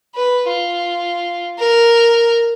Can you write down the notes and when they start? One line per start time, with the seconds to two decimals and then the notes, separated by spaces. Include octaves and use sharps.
0.15 B4
0.48 F4
1.59 A#4